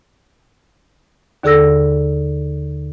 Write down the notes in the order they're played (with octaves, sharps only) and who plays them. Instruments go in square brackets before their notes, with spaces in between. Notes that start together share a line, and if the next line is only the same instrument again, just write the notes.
[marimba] D#2 D3 G#4 A4 E6 A#6